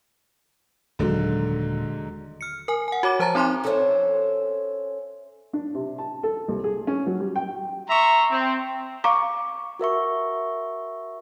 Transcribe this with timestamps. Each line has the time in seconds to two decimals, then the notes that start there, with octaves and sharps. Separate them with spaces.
0.99 D#1 G#2 D3 F#3
2.41 F6 C#7
2.68 A#4 G#5
2.88 F#5 G#5
3.03 F#4 C#5 D6
3.19 F3 C5 A5 A#5 A6
3.35 C4 D#4 C6 D6 F#6
3.64 C#4 A4 A#4 C5 C#5 E5
5.53 D4
5.75 C3
5.98 A5
6.23 A4
6.48 C2
6.64 G#4
6.87 C#4
7.07 F#3
7.20 G3
7.36 G5
7.89 E5 A#5 C6 C#6
8.31 C4
9.04 F5 A#5 C#6 D6
9.79 F#4 A#4 E5 C#6